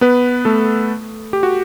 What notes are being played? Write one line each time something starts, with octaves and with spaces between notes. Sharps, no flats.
B3 B4
A3 A4
G4
F#4